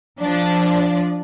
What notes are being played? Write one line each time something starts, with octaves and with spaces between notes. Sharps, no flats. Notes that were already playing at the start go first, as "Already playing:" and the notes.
F3 D4